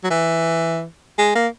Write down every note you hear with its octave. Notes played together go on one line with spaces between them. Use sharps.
F#3
E3
G#3
A#3